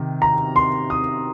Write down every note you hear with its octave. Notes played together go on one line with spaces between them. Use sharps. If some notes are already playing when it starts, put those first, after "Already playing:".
Already playing: C3 D#3
A#5
C6
D#6